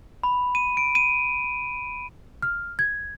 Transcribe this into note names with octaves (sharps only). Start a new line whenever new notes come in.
B5
D#7
D7
D#7
F6
G#6